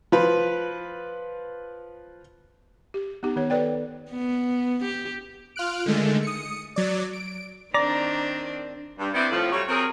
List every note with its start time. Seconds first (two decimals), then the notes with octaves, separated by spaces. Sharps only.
0.12 F3 B4
2.94 G4
3.23 B3 D#4 G4
3.36 D#3 B3 C#5
3.50 A4 B4 D5 G5
4.12 B3
4.84 G4
5.56 F4 F6 F#6 D7
5.86 D3 D#3 G#3 A3
6.23 D#6 C#7
6.76 F#3 D5
7.13 D7
7.74 D#3 C4 D4 D5 A#5
8.99 G2
9.14 B3 C4 E4 B4 C5 D5
9.31 A2 F3
9.52 F#3 G3 A3 C#5
9.68 F#3 C4 G#4 A#4